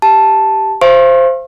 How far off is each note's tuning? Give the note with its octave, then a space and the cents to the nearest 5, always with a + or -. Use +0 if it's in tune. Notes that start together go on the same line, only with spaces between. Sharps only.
G4 +0 A5 +0
C5 +0 F5 -40 C#6 -45